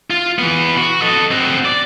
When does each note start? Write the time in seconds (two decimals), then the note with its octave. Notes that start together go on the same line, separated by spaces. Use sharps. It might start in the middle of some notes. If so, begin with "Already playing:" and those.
0.10 F4
0.39 E3 B3
0.77 F#4
1.02 A4 D#5
1.31 C4 F#4
1.65 D5